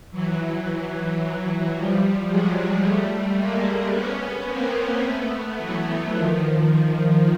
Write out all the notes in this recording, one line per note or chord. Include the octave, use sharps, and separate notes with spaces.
E3 F#3
E3 F#3
F3 G3
F#3 G#3
G3 A3
G#3 A#3
B3 C#4
A#3 C4
A3 B3
E3 F#3
D#3 F3
D#3 F3